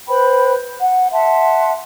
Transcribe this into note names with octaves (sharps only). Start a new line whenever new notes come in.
B4 C5 G5 B5
F#5
E5 F#5 A5 C6